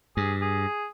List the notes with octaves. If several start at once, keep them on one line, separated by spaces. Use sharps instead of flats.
G2 G#4
G#4